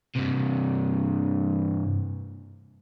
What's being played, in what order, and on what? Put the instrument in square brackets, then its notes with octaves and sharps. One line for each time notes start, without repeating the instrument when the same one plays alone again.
[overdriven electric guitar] G2 C3